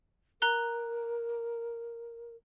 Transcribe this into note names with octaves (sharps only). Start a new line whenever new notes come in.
A#4 A#5 F#6 G7